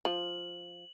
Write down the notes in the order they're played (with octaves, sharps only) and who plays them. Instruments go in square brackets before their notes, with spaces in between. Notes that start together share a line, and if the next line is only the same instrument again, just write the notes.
[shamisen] F3 [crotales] F#7